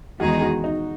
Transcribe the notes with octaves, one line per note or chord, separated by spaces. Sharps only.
E2 D#3 G#3 D#4 F#4 G#4
F#4
D#4